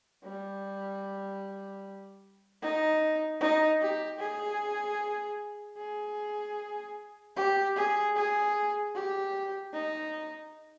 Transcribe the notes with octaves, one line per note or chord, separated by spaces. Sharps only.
G3
D#4
D#4
G4
G#4
G#4
G4
G#4
G#4
G4
D#4